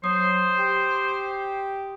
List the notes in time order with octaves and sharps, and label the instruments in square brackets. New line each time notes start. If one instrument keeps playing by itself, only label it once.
[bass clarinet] F#3 [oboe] C5 [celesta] D#6
[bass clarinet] G4